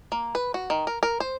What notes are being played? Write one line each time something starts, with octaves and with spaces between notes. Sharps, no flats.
A#3
B4
F#4
D#3
A#4
A#4
C5